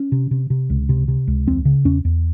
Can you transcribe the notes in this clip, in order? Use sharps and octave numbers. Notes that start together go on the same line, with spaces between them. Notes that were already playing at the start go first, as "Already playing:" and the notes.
Already playing: C#4
C3
C3
C3
C#2
C3
C3
C#2
E2 C4
C#3
E2 C#4
E2